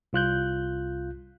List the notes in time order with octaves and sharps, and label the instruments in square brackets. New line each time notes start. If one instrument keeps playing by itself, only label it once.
[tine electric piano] C2 F4 F#6 G6